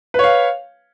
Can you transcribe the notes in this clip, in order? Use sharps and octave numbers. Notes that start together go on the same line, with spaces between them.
B4 C#5 F5